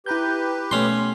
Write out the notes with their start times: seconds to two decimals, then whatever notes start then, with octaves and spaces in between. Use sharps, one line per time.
0.06 E4 G4 B4 A#5 G6
0.71 B2 A3 C#4 C6